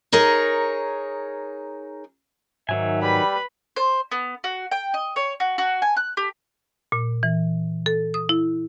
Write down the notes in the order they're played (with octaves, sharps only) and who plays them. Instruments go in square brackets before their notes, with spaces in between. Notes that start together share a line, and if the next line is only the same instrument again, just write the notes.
[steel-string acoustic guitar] D#4 G#4 A#4 C#5
[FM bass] G#2 [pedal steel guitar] D#3 F#3 G#5 [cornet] E5
[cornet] G3 [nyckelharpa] B4 B5
[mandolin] C5
B3
F#4
G5
D#5
C#5
F#4
F#4
G#5
F#6
G4
[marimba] A#2
E3
A4
D#6
E4